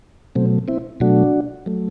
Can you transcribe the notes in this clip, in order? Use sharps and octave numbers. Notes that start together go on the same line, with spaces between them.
B2 F#3 A3 C4
C4 E4
B2 F#3 A3 D4 F#4
F#3 A3